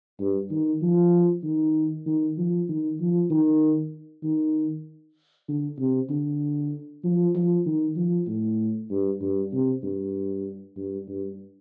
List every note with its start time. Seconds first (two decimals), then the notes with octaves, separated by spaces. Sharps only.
0.19 G2
0.51 D#3
0.82 F3
1.43 D#3
2.06 D#3
2.37 F3
2.69 D#3
3.00 F3
3.30 D#3
4.23 D#3
5.48 D3
5.78 C3
6.10 D3
7.04 F3
7.35 F3
7.66 D#3
7.96 F3
8.27 A2
8.90 G2
9.21 G2
9.53 C3
9.83 G2
10.77 G2
11.08 G2